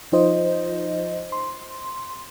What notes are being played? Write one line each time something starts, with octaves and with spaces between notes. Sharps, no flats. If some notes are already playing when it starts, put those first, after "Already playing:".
F3 D#4 F4 C5 D#5
C6